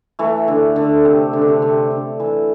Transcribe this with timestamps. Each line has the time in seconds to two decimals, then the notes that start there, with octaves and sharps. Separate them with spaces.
0.19 E3 A3
0.48 D3
0.76 D3
1.05 C3
1.33 D3
1.42 C3
1.48 D3
1.62 C3
1.91 D3
2.20 E3